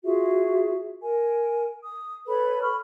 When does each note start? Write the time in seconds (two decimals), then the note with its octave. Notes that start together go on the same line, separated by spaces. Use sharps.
0.04 F4 F#4 G#4 E5
1.01 A#4 G#5
1.83 D#6
2.28 A4 B4 C#5 B5
2.62 B5 C#6 F6